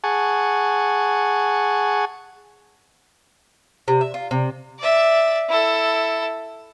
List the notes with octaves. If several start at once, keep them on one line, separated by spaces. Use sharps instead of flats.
G#4 F#5 G#5 A5 C#6
C3
E5
F4
C3
D5 E5
E4 A4